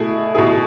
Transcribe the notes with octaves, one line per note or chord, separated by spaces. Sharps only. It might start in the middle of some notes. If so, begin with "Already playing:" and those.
Already playing: B2 A3 E4 G#4
B2 A3 E4 G#4